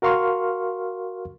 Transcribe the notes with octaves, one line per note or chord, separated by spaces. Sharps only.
F#4 A#4 F5 C6 C#6 F6